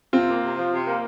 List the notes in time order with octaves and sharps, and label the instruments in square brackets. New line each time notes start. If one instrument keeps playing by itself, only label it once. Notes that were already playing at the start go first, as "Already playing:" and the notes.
[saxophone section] C3 [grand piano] C4 F4
[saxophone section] A#3
C3
F3
C3
A#3